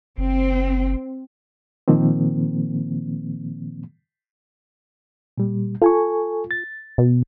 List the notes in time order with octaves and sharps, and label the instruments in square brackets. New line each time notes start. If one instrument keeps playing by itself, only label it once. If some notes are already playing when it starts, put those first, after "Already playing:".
[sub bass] F#1 [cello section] C4
[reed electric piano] A#2 D#3 F3 A#3 C4
A#2 G3
[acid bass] F4 [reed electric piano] A4 G#5 C#6
[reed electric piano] A6
[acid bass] B2